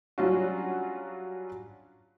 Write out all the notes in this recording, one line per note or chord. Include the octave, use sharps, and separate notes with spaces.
F#3 G3 C#4 D4 F4 F#4